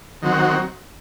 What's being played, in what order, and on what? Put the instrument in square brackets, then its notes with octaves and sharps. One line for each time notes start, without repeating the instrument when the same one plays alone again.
[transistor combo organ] D#3 F#3 C4 F#4